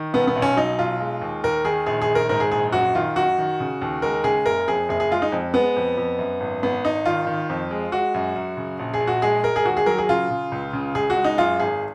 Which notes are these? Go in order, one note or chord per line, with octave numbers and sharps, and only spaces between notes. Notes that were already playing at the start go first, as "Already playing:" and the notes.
Already playing: D#3
B1 B3
B3
B1
C#4
F#3 D#4
B1 F4
G#3
D#2
D#2 A#4
D#3 G#4
A#1 G#4
G#4
D#3
A#4
G#2 A#4
G#4
A#1 G#4
F#2 F#4
D#3 F4
F#2 F#4
D#3
C#3
D#2
G#3 A#4
C#3 G#4
F#1 A#4
F2 G#4
F#1 G#4
G#4
G#3 F4
D#4
F2
G#3 B3
F2
F2
F#2
G#1
G#1 B3
G#1 D#4
D#3 F4
D#3
F2
G#3
G#3 F#4
F#2
F#2
C#3
A#1
G#4
A#1
F#4
G#3 G#4
G#3 A#4
G#4
D#2 F#4
G#4
F#3 A#4
G#4
C#3 F4
C#3
C#2
C#3
C#2 G#4
F#4
G#3
D#4
F#2 F4
G#1 G#4